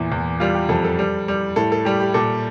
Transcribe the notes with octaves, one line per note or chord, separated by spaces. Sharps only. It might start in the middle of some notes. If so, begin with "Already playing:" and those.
Already playing: E2 A#2 E4
E2
G3 F4
G4
F2 A4
A4
G3
G3
A2 A4
A4
G3 G4
G4
A#2 A4